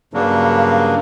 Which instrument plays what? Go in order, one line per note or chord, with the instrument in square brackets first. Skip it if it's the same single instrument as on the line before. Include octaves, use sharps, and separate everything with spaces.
[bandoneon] G2 C#3 F#3 A#3 D4